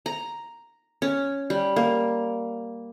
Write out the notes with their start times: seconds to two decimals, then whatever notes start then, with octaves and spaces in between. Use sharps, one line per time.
0.06 A#5
1.02 C#4
1.50 G3
1.76 A#3